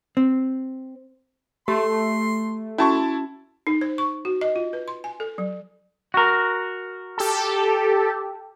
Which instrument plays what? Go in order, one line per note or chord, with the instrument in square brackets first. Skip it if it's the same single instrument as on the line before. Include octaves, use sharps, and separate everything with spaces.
[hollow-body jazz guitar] C4
[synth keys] A3 [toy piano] G4 [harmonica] C6
[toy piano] C#4 F#4 [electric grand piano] E4 A5 C#6
[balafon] D#4
C5
C#6
F#4
D#5
F4
B4
C6
G#5
A4
F#3
[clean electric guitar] F#4 A#4
[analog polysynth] G4 A4